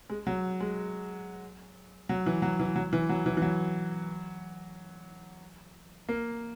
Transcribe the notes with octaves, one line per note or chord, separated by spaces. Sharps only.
G#3
F#3
G#3
F#3
E3
F#3
E3
F#3
E3
F#3
E3
E3
F#3
A#3